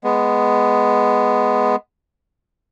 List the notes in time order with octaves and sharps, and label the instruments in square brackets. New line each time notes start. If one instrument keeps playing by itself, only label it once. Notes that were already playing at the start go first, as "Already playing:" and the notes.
[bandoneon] G#3 B3